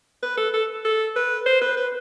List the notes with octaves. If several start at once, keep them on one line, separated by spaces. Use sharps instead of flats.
B4
A4
A4
A4
B4
C5
B4
B4